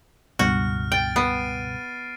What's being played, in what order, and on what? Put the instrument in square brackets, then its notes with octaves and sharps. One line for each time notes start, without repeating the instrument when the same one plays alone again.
[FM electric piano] C#2 G2 B2 [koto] F#4 [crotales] F6
[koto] G5 [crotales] A6 D7
[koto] B3 [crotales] C7 D#7